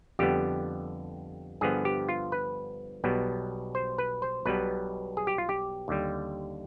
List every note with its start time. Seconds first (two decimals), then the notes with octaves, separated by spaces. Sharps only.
0.19 F2 D3 G3 B3 G4
1.61 G2 D3 F3 B3 G#4
1.85 G4
2.09 F4
2.32 B4
3.04 B1 B2 G3 B3
3.75 C5
3.98 B4
4.22 C5
4.45 B1 B2 G3 B3 B4
5.17 G#4
5.27 G4
5.38 F4
5.49 G4
5.88 D#2 D3 G3